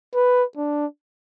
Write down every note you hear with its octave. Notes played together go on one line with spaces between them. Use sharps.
B4
D4